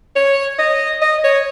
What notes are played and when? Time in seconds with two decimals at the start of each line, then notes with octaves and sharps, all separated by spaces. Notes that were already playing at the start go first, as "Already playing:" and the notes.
0.16 C#5
0.59 D#5
1.01 D#5
1.24 C#5